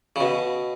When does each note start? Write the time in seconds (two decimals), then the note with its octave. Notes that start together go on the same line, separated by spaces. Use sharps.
0.16 C#3
0.20 B2